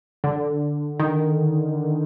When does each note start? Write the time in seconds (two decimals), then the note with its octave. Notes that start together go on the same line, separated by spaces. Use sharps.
0.24 D3
1.00 D#3